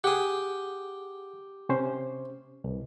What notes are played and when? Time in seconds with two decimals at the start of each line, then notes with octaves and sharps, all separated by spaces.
0.04 G4 G#4 F#5 G5 D#6
1.69 C3 C#4 C5
2.64 C2